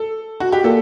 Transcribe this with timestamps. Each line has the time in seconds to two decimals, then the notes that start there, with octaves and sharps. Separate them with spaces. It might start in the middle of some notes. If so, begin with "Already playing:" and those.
Already playing: A4
0.40 F#4
0.52 G4
0.64 A#2 A4